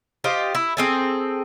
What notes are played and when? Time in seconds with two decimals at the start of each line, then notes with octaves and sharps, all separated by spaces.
0.24 F4 G4 C5 D#5
0.55 E4
0.77 C4 G#4 A4